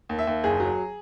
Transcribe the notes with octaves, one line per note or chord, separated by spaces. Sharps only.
D#2
E5
D#2
F#1 G#4
F#3